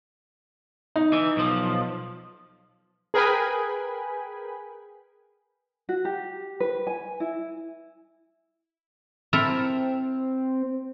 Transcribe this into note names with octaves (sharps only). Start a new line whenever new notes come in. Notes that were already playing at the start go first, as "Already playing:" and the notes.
D#4
E3
B1 F3
G#4 A#4 B4 G5 G#5 B5
F#4
G4
B4
G#5
E4
C4 E4 A4 A#4